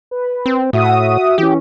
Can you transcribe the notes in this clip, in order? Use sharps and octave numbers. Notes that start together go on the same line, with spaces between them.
B4
C4
A2 F#4 E5 D#6
E3 C#4 G4